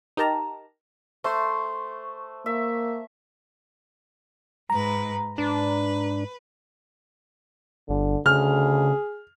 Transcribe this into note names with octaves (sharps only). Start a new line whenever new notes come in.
D#4 G4 A#4 A5 A#5
A3 C5 C#6
A#3 E5
G#2 B4 A#5
G#2 D4 B4
G1 D3
D2 C#3 G#4 F6